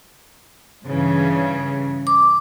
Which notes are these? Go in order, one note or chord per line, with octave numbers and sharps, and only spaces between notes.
G2 C#3 E3
D6